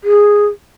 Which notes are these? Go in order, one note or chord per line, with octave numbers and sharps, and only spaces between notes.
G#4